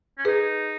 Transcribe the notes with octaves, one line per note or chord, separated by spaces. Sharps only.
C#4
D#4 G#4 B4